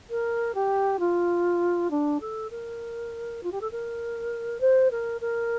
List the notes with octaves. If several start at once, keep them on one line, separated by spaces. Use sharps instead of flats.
A#4
G4
F4
D4
A4
A#4
F4
G4
A4
A#4
C5
A#4
A#4